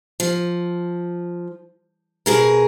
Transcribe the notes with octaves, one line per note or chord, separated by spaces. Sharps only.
F3
B2 G#4 A#4